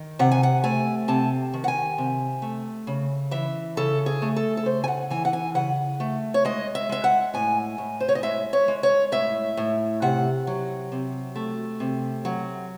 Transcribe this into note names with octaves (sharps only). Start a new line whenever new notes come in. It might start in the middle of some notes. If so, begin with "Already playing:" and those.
Already playing: D#3
C3 F#5
G#5
F#5
A3 G#5
C3 A5
D#3
F#5
G#5
C3
A3
C#3
E3 E5
C#3 A4
G#4
A3
A4
A4
C#3 C5
G#5
F#5
E3 G#5
F#5
G#5
C#3 F#5
A3
C#5
G#3 D#5
E5
G#3 E5
F#5
A2 G#5
A2
C5
C#5
D#5
G#3 E5
C#5
G#3
C#5
A2 E5
A2
C3 F#5
F#3
C3
A3
C3
F#3